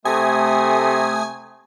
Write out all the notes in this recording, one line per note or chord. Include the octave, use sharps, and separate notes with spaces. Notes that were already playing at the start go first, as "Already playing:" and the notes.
C3 A3 G#5 D#6